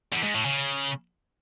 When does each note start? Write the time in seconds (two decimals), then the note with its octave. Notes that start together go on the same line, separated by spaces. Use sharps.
0.13 E2
0.24 G#2
0.34 A2
0.45 C#3